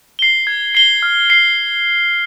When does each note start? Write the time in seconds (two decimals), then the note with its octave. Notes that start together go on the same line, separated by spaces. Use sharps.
0.19 C7 G7
0.47 G#6
0.75 C7 G7
1.03 F6
1.30 C7 G7